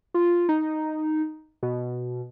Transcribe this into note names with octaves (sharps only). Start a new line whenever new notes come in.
F4
D#4
B2